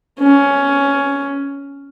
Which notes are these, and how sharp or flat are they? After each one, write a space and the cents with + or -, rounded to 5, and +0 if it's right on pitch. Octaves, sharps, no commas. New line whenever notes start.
C#4 +10